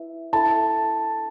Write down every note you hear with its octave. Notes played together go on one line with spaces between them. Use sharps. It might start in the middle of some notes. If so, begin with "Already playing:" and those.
Already playing: E4 B4 E5
E4 A4 E5 A5 B5